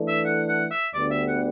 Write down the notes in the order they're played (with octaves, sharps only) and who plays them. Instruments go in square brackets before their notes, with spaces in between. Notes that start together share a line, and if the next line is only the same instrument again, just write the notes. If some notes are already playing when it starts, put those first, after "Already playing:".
Already playing: [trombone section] E3 A3 D4 A4
[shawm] E5
F#5
F#5
E5
[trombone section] D2 D3 G3 B3 D4 [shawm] D5
[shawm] E5
F#5